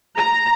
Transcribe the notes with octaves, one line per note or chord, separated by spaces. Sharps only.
A#5